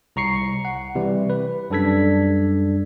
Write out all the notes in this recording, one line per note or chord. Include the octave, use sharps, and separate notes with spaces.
C2 A#5 C#6 C7 C#7
F#5
C3 E3 G3
B4
F#2 G3 D4 A4 G#6 B6